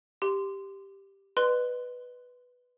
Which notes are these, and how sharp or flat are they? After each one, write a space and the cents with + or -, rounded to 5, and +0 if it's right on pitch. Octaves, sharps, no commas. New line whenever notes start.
G4 +0 C6 -15
B4 +0 D#5 -45 C6 -20